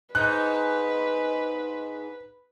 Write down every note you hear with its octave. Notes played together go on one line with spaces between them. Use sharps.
G#2 D#4 B4 F#6